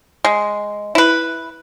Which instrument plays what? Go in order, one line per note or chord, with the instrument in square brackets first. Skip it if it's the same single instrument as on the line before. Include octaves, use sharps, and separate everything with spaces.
[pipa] G#3
E4 B4